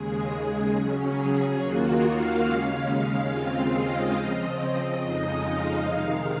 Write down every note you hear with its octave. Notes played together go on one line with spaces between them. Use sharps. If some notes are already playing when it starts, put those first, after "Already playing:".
Already playing: D#2 C#3 G#3 G#4
C#3 F#3 C#4
G#4
D#2 D#3 A#3 F4 F#4
F5
D#2 C#3 G#3 C#4
D#2 C#3 G#3 C4 F4 F5
D#5
C#3 F3 C4
F2 C#3 F3 G#3 D#4
F5
C3 D#3 G#3 D#4